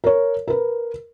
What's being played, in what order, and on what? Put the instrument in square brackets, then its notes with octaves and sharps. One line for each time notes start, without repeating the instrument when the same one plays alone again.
[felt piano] A#4 C#5
A#4 B4